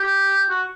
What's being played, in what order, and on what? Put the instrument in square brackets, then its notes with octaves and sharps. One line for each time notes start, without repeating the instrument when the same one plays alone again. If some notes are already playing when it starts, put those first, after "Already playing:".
Already playing: [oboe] G4
F#4